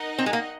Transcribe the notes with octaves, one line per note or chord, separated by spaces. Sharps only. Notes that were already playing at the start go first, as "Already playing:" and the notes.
Already playing: D#4 A#4 D#5 F#5
C4
G#3
A#3